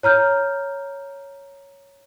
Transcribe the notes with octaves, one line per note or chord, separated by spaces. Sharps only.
C#5 A#5 F6 G6